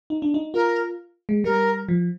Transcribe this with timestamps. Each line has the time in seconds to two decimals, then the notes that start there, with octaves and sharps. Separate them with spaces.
0.10 D#4
0.22 D4
0.34 D#4
0.54 F4 A#4
1.29 G#3
1.44 G3 A#4
1.89 F3